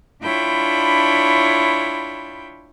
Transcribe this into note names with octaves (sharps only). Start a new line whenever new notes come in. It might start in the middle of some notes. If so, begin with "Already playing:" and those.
D4 E4 F4 C#5 G5 B5